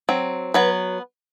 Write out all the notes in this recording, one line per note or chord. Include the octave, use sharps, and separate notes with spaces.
F#3 C4
F#3 B3 B4